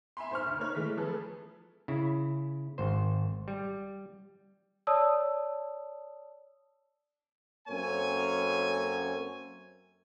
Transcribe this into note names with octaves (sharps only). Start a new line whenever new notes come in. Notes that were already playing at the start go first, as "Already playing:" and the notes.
E5 G#5 B5 C6
B1 C5 C#6 F6
D2
A#3 D#4 C#5 F#6
E3 G#3 A3 B6
F3 A3 G#4 A4 B4
C#3 E4
G#1 C5
G3
C#5 D5 A5 D#6 E6
F#2 A#3 C4 A4 C#5 G#5